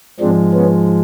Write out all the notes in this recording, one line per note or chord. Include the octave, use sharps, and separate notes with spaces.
G#2 F3 G#3 C4 D4
B3 C#4